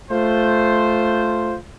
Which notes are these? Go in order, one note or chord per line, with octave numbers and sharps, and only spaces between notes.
A3 F4 C5